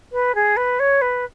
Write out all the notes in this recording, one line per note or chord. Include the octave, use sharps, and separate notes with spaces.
B4
G#4
B4
C#5
B4